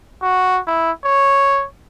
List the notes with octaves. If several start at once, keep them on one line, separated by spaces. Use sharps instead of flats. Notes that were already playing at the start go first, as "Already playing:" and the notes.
F#4
E4
C#5